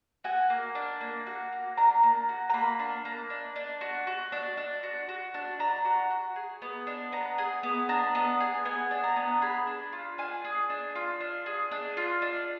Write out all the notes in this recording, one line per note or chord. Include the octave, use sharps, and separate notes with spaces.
F#4 G#5
A#3
D4
A#3
F#4
A#3
D4 A#5
A#3
F#4
A#5
A#3 B5
D4
A#3
D4
D4
F#4
F#4
D4
D4
F#4
F#4
D4
D4 A#5
F#4
F#4
G#4
B3
D4
B3 A#5
G#4
B3
D4 A#5
B3
G#4
B3 G#5
D4
A#5
B3
G#4 B5
D4
F4
D4 G#5
G#4
D4
F4
D4
G#4
D4
F4
D4